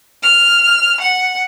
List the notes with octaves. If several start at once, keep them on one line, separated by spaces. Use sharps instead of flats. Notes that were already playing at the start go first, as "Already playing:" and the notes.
F6
F#5